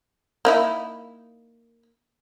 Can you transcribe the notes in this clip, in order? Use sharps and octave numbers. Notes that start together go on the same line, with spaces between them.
A#3 D#4 E4